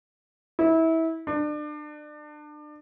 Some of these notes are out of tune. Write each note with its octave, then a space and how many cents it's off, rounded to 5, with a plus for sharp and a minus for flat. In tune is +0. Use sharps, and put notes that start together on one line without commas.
E4 -25
D4 +30